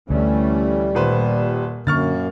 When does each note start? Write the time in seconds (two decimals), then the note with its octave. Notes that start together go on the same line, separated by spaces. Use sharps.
0.10 D2 E3 G3 A3 C#4
0.95 D#1 A#2 B4 C5
1.87 F#2 D3 A#3 C#6 F6 A6